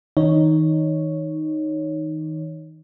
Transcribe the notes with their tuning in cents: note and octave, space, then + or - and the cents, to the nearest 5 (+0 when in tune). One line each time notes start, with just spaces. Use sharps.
D#3 +40 D#4 -5 C#5 +0